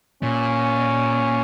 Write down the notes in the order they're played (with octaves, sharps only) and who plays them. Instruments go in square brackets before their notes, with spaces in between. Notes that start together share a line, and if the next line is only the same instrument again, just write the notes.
[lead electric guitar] A#2 [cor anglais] C#4